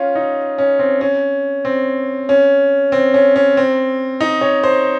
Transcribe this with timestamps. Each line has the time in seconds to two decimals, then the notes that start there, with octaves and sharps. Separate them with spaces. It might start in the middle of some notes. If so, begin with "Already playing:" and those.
Already playing: C#4 F4
0.15 D#4
0.58 C#4
0.79 C4
1.01 C#4
1.65 C4
2.29 C#4
2.92 C4
3.14 C#4
3.36 C#4
3.57 C4
4.21 D#4
4.41 C#5
4.64 C5